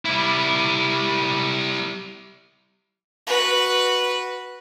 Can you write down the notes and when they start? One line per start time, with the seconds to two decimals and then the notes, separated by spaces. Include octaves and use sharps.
0.05 G3 E4
3.27 F#4 B4